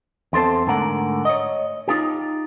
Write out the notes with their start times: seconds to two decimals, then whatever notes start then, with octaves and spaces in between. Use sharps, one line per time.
0.33 E2 C4 A4 C5 A5
0.67 G#2 D3 A3 A#4 F#5
1.25 C#5 D#5
1.88 D#4 F4 G4